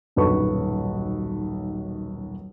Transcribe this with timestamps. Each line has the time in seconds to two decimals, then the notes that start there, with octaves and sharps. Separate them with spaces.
0.16 D#1 B1 F#2 B4 C#6